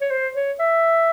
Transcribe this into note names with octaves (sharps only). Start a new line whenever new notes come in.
C#5
C5
C#5
E5